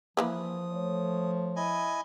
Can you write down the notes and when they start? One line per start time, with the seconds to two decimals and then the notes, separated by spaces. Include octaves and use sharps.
0.17 E3 F3 A#3 B4 D#6
0.73 A3 C#5
1.56 E4 D#5 G#5